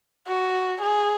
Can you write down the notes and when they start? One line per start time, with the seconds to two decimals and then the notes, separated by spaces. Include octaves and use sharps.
0.27 F#4
0.81 G#4